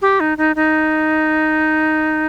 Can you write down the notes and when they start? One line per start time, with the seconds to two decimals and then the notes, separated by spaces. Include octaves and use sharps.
0.02 G4
0.20 D#4
0.38 D#4
0.56 D#4